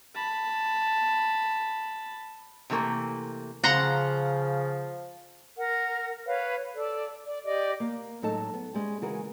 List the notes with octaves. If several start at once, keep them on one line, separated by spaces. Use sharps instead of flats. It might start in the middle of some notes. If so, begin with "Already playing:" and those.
A5 B5
C3 E3 A3 A#3
C#3 F3 F#5 A#5 C6
A#4 F#5
B4 C#5 F5
A4 D5
D5
G4 D5 D#5
A#3
A2 F#3 G#3 D#4 A4 A5
B3
G3 G#3 C#4
C#3 E3 G#3 F#4 A#4